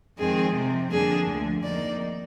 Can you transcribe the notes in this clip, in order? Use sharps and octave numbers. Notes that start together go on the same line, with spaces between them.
F2 D#3 G#3 C4 G#4
C3 F3 C4
F2 D3 G3 A#3 D4 G#4
D2 D3 F3
F2 D#3 A#3 D#4 D5